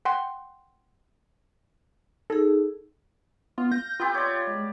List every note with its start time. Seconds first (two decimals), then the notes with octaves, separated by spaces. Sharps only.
0.05 F#5 G5 C6
2.30 D#4 G#4 A4
3.58 B3 F4 F5
3.72 G6 A#6
4.00 B3 C4 F4 G4
4.14 C#5 D5
4.47 G#3